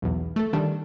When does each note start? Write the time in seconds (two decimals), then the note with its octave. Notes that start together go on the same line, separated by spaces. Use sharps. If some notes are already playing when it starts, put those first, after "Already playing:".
0.02 B1 E2
0.36 A3 A4
0.53 D#3 G3 A3 D4